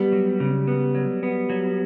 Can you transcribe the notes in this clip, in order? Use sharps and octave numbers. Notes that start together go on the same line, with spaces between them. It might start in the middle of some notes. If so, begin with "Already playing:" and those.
Already playing: G3 B3
F#3
C#3
B3
F#3
B3
F#3